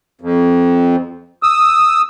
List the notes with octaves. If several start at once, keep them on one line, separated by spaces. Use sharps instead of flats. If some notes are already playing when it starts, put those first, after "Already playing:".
F2
D#6 E6